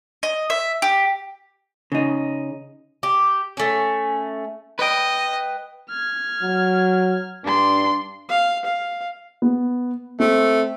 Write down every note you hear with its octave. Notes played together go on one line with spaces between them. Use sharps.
D#5
E5
G4
C#3 D#4
G4
A3 C#4
B4 D#5 G5
F6 G#6
F#3
G2 D4 C6
F5
F5
B3
A3 C4